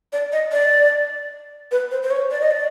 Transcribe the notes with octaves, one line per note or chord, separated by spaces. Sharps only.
D5
D#5
D5
B4
C5
C5
C#5
D5
D#5
D5